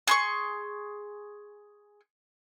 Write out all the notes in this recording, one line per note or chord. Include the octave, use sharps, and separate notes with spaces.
G#4 C6 C#6